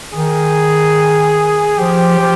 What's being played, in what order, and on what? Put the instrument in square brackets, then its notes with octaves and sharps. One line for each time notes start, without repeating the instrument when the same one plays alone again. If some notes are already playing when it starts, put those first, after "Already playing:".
[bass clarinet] D#3 [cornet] G#4
[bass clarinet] F3 [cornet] G4
[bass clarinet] F3